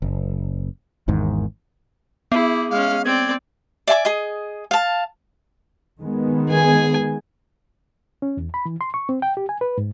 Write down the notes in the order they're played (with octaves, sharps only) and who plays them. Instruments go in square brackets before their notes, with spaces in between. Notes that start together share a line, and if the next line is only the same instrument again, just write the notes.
[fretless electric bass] F#1
G#1 E2 G#2 D#3
[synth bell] B3 [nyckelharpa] E4 G#4
[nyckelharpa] G#3 C#4 [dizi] F5
[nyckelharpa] C4 D5 [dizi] G#6
[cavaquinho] D5 E5 G#5 D6
G#4 D#5
F5 A5
[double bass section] D#3 G#3 B3
[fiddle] G#4 G#5
[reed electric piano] C#4
E2
B5
E3
C6
C#6
C4
G5
G4
G#5
B4
G#2